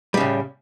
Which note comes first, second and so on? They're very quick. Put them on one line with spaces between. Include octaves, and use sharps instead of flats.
G3 C#3 A2